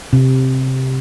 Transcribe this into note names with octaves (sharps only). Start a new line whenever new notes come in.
C3